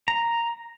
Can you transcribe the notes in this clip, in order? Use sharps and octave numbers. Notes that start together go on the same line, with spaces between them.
A#5